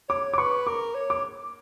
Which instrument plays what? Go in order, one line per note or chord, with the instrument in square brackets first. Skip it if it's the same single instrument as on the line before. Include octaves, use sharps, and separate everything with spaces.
[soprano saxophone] C#5 [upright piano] D6
[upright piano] D6
[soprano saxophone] B4 [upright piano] C#6
[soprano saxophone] A#4 [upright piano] D6
[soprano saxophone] C#5
[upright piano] D6